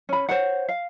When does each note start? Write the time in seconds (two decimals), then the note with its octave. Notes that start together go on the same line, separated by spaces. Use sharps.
0.09 C#4 B5
0.29 C5 C#5 F#5
0.69 F5